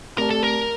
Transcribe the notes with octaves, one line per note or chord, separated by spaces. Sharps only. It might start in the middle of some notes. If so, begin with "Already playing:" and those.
A3 C4 G4 A#4 D5 A5
A4
A#4